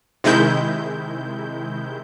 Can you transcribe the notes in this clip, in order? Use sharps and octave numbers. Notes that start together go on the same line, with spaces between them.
C3 D#3 G#3 E4 G6